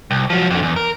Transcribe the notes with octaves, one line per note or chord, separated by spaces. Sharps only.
C2
F3 F#3
F2 D3
E2
A#4